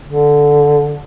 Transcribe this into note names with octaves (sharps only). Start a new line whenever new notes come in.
D3